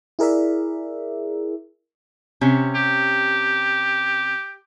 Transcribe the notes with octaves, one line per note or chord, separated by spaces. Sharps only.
E4 G#4 A#4 D5 E5
C3 C#4
G4